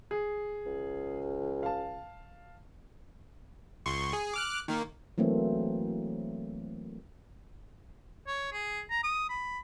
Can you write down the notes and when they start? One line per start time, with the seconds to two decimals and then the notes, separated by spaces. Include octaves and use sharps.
0.11 G#4
0.66 C#2
1.63 F5 A5
3.86 C#2 C6 C#6
4.13 G#4
4.34 D6 F6 F#6
4.68 D#3 A#3
5.18 E3 F#3 A3 A#3 C4
8.27 C#5
8.52 G#4
8.90 A#5
9.03 D#6
9.29 B5